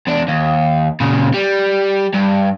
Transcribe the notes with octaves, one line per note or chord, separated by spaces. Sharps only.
E2 D4
D#2
A#2 C#3
G3
G2